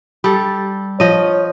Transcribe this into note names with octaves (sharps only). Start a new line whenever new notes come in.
G3 A4
F3 C#5 D#5